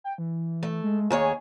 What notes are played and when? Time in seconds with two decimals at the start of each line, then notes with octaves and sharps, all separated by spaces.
0.04 G5
0.18 E3
0.63 A3
0.84 G#3
1.10 D#2 G#4 C#5 G#5